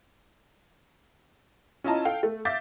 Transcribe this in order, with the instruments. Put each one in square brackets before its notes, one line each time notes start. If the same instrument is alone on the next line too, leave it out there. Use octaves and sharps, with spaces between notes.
[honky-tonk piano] C#4 E4 F4 D#5 A5 A#5
A4 F5 G5
A3
E5 F5 D6 G6 A6 B6